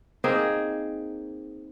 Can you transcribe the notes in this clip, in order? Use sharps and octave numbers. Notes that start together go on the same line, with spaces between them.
A#3 C4 D#4 G#4